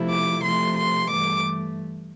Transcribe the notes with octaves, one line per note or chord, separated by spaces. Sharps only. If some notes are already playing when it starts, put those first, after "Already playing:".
Already playing: C3 F3 A3 E4
D6
C3 F3 A3 C6
C6
G2 E3 A3 D6